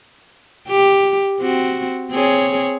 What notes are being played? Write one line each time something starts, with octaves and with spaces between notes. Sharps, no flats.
G4
C4 F#4
C4 G#4 C#5